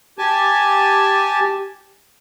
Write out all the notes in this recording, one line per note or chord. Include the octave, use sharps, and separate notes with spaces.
G4 G#5 A5